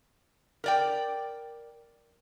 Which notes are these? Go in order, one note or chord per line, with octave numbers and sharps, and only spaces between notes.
A#4 D5 G5